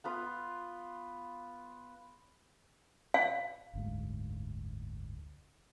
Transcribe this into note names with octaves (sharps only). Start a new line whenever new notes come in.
B3 F4 B4
F5
F#1 D2 G#2